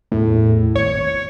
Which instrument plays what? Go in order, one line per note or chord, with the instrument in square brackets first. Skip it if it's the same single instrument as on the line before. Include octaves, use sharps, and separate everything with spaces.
[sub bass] E2 [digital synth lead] A2
[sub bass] G#1 [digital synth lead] C#5